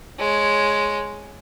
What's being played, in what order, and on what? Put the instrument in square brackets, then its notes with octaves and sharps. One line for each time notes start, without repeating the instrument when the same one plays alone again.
[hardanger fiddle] G#3 C#5